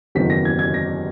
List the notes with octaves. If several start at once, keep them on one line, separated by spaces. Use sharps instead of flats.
F#1 E2 D#3 F#3 B6
A#6
G#6
G#6
A#6